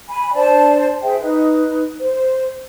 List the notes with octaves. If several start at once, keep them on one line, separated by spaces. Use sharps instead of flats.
G#5 B5
D4 C5 D5 A5
G#4 C5 E5 G5
D#4 B4
C5